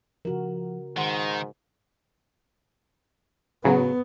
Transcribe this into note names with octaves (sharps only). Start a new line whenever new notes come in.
C#3 F3 F#4 A#4
G#2 D#3 F#5 C6
A2 C#3 F#3 B3